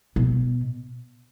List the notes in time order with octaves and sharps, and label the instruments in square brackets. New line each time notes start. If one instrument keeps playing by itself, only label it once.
[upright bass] B2